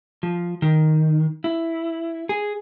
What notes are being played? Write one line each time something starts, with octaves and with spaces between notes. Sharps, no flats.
F3
D#3
E4
G#4